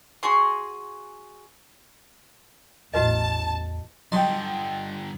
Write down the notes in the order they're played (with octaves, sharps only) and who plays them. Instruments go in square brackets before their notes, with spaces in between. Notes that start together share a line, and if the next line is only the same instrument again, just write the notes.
[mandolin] F#4 G#4 C6
[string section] A1 A5 [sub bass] E2 [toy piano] F#4 B4 D#5
[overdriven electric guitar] G2 D3 [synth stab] F#3 [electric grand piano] D#5 G5 [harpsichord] A5 C6